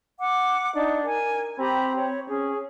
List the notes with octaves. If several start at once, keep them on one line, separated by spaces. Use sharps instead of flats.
F#5 D6
D4 D#4
A#4 G#5
C4 G4 A#5 B5
C#5
C#4 G#4